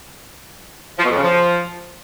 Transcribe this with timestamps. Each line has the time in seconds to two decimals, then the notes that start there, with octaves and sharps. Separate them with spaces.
0.99 F3
1.04 B2
1.10 F2
1.16 C#3
1.22 F3